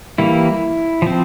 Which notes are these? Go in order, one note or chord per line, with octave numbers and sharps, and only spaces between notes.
E3 G3 A#3 E4
F3 C4